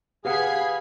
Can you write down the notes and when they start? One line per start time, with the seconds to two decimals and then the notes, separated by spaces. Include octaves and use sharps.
0.25 G4 G#4 B4 F5 F#5 B5 G#6 C7